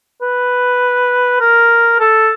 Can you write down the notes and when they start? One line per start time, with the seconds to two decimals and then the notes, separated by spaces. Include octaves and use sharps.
0.21 B4
1.40 A#4
2.00 A4